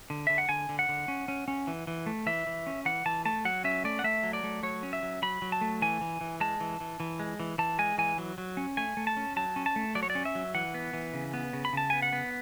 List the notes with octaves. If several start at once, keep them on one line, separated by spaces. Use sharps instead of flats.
D3
D3 E5
F#5
D3 G#5
D3
F#5
D3
C#4
C#4
C#4
E3
E3
A3
E3 E5
E3
C#4
E3 F#5
E3 A5
A3 A5
F#3 F#5
C#4 E5
A3 D5
F#5
A3 E5
F#3
D5
A3
F#3 C#5
C#4
E5
F#3
F#3 B5
F#3
A5
A3
E3 G#5
E3
E3
G#3 A5
E3
E3
E3
G#3
E3
E3 A5
G#3 G#5
E3 G#5
F#3
F#3
C#4
A3 G#5
A3
A5
C#4
F#3 A5
C#4
A5
A3
F#3 D5
C#5
D5
C#4
E5
F#3
E3 F#5
B3
E3
C#3
B3
C#3
B5
C#3 A5
B3 G#5
F#5
B3